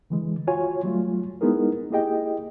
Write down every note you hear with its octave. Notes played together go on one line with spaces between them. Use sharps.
D3 E3 G#3
F4 F#4 C#5 G#5
F#3 G3 A3 F4
G#3 B3 D#4 E4 G#4 A#4
A#3 E4 G4 G#4 D#5 G5